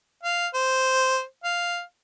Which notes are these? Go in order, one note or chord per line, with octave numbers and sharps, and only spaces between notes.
F5
C5
F5